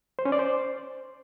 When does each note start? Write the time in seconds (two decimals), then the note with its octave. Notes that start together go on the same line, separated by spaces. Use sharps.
0.19 C5
0.25 C#4
0.32 D5
0.39 C5